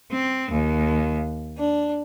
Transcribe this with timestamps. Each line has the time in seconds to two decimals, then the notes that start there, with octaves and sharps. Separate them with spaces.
0.12 C4
0.52 D#2
1.58 D4